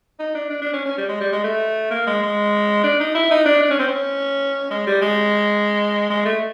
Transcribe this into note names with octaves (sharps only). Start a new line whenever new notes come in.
D#4
D4
D4
D4
C#4
C#4
G3
G#3
G3
G#3
A3
A#3
G#3
G#3
D4
D#4
E4
D#4
D4
D4
C#4
C4
C#4
G#3
G3
G#3
G#3
A3